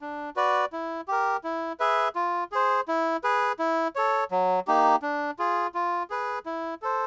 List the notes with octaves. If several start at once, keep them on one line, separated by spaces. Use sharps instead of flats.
D4
F#4 B4 D5
E4
G4 A#4
E4
G#4 B4 E5
F4
G#4 C5
E4
G#4 B4
E4
A4 C#5
F#3
A#3 D#4 G4
D4
F4 G#4
F4
G#4 B4
E4
A4 C5